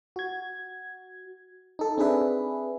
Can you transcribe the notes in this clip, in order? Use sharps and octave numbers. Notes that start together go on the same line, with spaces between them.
F#4 G#6
D#4 A4
C4 D4 G#4 B4 E5